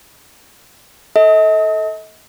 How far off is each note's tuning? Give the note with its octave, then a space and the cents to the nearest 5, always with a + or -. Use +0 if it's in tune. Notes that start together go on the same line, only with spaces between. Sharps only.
A4 +0 D#5 +40